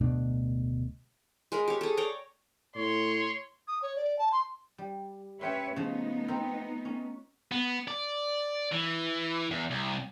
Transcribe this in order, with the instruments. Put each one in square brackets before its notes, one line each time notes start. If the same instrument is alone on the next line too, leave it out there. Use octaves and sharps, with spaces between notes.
[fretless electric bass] D1 B2 A3 D4
[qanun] G#3 A#4 B5
G4 C#5
G#4 A4
C#5 D5 G5 A#5
[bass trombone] A2 [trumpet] C#5 [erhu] C6
[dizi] D#6
C#5
D5
A5
C6
[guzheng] G3
[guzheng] C#4 G5 C6 [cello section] B4 C#5 E5
[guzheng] C#3 F3 [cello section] A3 B3 D#4
[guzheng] C4 A#4
C#4
[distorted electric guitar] B3
D5
E3
E2
C2